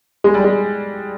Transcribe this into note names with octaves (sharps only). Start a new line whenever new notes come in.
G#3
G3
G#3